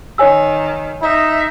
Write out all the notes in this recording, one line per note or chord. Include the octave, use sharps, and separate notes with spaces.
D#3 C#5 G#5 E6
D#4 E5